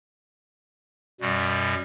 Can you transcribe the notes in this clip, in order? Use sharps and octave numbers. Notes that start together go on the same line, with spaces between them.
F#2 B2 G3